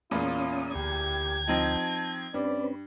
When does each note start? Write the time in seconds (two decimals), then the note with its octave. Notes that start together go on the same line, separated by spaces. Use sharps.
0.11 E2 A#2 C#4 F4 D#6
0.75 D2 G4 G5 G#6
1.47 F3 C4 D#4 A5
2.34 G2 C4 C#4 B4 D5